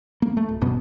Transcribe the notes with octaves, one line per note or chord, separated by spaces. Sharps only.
A#3
A3
D1
G1 F#2 B2 B3